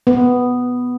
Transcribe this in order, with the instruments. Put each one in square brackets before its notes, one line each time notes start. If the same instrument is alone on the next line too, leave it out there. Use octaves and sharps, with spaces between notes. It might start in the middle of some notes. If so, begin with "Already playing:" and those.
[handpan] B3